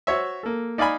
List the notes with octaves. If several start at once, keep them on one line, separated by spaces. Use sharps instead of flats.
F#4 C5 C#5 E5
A#3 A4
D#4 D5 F5 G#5 B5